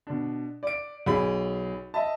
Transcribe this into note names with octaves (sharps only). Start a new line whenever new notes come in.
B2 D4
D5 D7
B1 G#4 B5
D#5 E5 A5